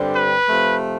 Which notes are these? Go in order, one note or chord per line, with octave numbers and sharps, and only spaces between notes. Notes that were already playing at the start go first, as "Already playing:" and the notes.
Already playing: G2 D3 G3 C4
B4
C3 F3 A3